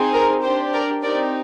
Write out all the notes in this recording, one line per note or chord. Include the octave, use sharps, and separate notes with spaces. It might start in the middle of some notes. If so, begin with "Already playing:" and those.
Already playing: C4 D#4 G#4
A#4
D4 G4 C5
A#4 D5
C4 D#4 G4 A#4 D5